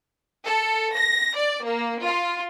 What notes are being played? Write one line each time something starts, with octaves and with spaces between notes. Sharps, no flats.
A4
A#6
D5
A#3
F4